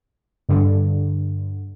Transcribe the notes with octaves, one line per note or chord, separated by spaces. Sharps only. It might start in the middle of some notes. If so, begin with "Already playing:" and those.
G2 D3